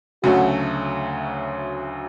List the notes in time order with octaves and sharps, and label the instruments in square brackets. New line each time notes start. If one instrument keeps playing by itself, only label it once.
[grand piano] D2 C#3 F#3 A3 [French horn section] F#4